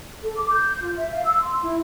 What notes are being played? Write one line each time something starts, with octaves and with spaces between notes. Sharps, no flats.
A4
D6
G6
F4
E5
F5
E6
C6
E4